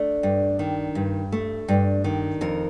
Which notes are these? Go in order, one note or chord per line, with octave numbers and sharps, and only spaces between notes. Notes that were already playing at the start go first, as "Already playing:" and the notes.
Already playing: A3 D4
G2
D#3
G2
A3
G2
D#3
F2 A#4